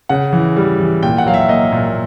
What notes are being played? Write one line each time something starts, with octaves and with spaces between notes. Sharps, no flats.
C#3 F#5
E3
G3
E3
A#2 G5
F#5
F#3 F5
E5
A#3 D#5
A#2